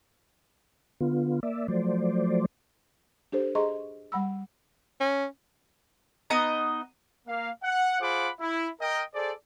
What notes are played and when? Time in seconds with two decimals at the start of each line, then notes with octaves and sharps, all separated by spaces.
1.01 D3 B3 F4
1.43 A#3 D5 E5
1.68 F3 F#3 A3 C5 D5
3.32 D4 G4 A4 C5
3.55 G#4 D#5 A#5 C6 C#6
4.12 G3 F#5 B5 E6
5.01 C#4
6.30 B3 D#4 D#5 A#5
7.28 A#3 F5
7.64 F#5
8.01 F4 G#4 C5 F#5 B5 D6
8.40 E4
8.81 A#4 D#5 G5
9.14 G#4 A4 C5 D5